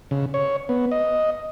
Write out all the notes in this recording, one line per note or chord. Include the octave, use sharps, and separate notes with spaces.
C#3
C#5
B3
D#5